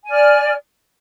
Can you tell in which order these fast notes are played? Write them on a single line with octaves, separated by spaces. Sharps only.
G#5 D5 F6